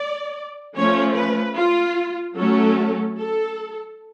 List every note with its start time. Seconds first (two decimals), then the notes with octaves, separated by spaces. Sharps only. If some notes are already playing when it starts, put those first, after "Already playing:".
Already playing: D5
0.76 F3 A3 C#4 C#5
1.16 B4
1.56 F4
2.36 F#3 A3 C#4 A4
3.16 A4